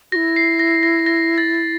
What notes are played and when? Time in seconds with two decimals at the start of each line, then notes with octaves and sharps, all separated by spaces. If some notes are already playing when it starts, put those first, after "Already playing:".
0.12 E4 F#4 A#6
0.36 C7
0.59 A#6
0.83 A#6
1.06 A#6
1.38 A6